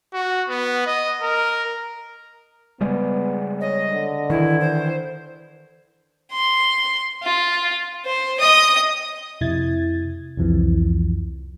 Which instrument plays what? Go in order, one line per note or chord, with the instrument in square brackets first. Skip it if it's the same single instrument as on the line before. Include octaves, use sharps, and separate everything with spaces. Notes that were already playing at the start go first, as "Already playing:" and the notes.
[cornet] F#4
B3
D#5
A#4
[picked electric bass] C#3 G3 G#3 [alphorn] B3
[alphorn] C#5 [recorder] D#5
[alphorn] D3
[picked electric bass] D#3 E3 [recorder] E4
[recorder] C5
[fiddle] C6
F4
C5
D#5 D#6
[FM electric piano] F2 C3 E4 G#6 A6
C2 F2 E3 F3